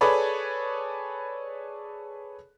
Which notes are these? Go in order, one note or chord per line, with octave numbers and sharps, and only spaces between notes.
G#4 A4 B4 C#5 D5 B5